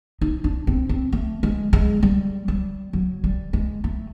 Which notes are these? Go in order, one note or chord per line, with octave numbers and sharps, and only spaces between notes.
D#4
D4
C4
C4
A3
G#3
G#3
G3
G3
F#3
G3
G#3
A3